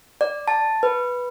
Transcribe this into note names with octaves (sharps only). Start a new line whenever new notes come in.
D5
A5
B4